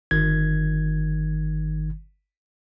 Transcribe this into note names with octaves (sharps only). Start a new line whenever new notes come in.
G1 D#3 G#6